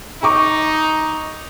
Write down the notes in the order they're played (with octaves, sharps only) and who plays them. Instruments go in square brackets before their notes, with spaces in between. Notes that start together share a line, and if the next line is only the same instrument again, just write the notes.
[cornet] D#4 [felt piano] A#5 C#6 D6